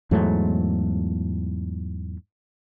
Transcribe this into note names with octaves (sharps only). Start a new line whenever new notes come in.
E2 G#2 F#3 A3